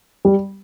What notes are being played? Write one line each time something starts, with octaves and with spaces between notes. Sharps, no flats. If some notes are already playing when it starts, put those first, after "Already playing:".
G3